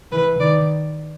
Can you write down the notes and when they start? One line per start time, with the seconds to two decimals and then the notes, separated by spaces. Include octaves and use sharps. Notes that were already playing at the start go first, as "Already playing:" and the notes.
0.12 E3 B4
0.40 D#3 D5